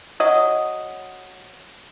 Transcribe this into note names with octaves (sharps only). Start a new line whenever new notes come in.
F#3 D#5